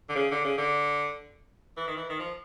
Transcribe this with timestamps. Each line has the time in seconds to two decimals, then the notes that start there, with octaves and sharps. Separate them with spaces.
0.09 D3
0.16 C#3
0.31 D3
0.45 C#3
0.58 D3
1.77 E3
1.87 D#3
1.96 E3
2.09 D#3
2.20 F3